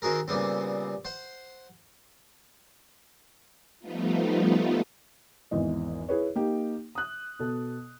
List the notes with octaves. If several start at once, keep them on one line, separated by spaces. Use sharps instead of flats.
D#3 C4 F#4 G#4 A#4
A#2 C#3 G3 B3 C4
C5 F#5
F3 G3 A3 B3 D#4 F4
G#1 E2 E3 D#5
E4 G#4 B4 C#5
A#3 D#4 G4
D#6 F#6
B2 A4